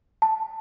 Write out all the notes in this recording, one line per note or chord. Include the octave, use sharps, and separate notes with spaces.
A5